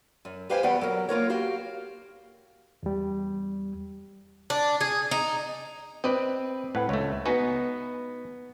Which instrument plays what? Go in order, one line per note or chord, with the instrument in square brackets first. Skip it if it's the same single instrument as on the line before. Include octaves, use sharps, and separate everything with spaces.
[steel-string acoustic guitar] F#2
G4 B4 C5 F5 G5 G#5
E2 G3 B4 F#5 G5
F#3 A#4
A#3 F4 A#4 C#5
F#4 G4 F5
[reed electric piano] E2 G3
[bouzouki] D4
G#4
D#4
[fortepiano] C4 [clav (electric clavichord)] B4 D5 D#5
[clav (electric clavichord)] A2 [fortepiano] B4 F#5
[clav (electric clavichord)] C#2 A3 [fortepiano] C#5
[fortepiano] B3 G#5 [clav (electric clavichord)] D#4 F#4 B4